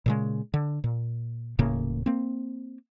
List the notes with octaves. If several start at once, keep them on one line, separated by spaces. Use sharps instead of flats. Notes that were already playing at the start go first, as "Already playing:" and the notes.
A#2 C#3 G#3
D3
A#2
D#1 A2 C#3 A#3
A#3 C4